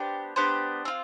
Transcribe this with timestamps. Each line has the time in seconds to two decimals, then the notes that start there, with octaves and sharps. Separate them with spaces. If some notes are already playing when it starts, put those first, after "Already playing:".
Already playing: B3 D4 G4 C5
0.36 B3 D4 G4 C5
0.85 C4 F4